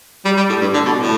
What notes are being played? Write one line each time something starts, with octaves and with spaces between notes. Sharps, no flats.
G3
G3
A2
G2
D3
B2
A2